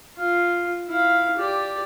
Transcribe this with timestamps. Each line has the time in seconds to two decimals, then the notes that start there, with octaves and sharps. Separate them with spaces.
0.17 F4 C6
0.88 E4 F5
1.37 G4 D5